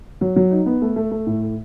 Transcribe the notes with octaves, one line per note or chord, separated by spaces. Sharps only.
F#3
F#3
D#4
B3
A3
A3
A3
A2